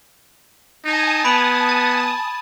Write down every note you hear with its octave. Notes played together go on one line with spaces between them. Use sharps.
D#4 G#5 A5 D#6
B3 B5 D7 F#7
A6